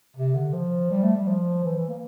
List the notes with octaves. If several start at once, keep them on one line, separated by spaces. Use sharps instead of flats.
C3
D3
F3
G3
A3
G3
F3
E3
E3
A#3